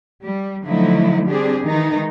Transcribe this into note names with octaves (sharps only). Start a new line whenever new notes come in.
G3
D3 F3 F#3 A3 D#4 E4
G3 C4 D4 G4 G#4
D#3 E3 G#3 D#4